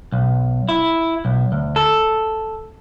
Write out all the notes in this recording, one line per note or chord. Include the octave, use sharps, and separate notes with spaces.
B1
E4
B1
D2
A4